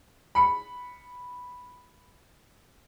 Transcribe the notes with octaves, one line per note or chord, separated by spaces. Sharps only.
B5 C#7